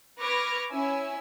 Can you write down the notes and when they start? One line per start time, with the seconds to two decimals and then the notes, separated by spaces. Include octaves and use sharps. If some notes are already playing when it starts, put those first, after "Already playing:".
0.19 B4 C#6 D6 F6 G#6 A#6
0.71 C#4 E4 G#5 E6